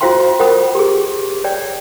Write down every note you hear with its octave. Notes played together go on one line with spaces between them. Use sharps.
F4 F#4 C5 F5 G5 C6
A#4 C5 F#5 G5 B5 D#6
G4 G#4
C#5 D5 G5